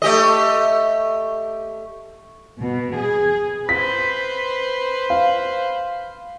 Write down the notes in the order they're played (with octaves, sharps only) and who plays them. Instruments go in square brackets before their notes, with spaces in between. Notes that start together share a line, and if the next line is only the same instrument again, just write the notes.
[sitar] A3 G4 D#5
[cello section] B2
G#4
[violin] B4 C5 [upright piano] B6
[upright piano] F5